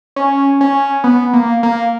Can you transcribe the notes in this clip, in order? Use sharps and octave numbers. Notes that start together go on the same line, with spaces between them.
C#4
C#4
B3
A#3
A#3